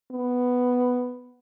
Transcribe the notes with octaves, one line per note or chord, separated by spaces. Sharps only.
B3